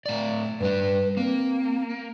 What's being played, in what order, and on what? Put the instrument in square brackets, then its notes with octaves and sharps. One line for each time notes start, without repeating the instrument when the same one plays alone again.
[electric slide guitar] A2 D5
[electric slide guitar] G2 G3 D4 [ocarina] B4
[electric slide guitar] A#3 [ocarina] C4